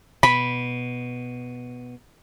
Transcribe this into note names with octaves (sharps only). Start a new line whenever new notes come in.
B2 B5